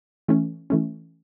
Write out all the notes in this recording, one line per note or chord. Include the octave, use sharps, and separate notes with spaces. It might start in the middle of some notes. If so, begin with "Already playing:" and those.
E3 A3 C#4
E3 A3 C#4